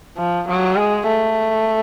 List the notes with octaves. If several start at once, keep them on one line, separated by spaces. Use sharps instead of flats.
F3
F#3
G#3
A3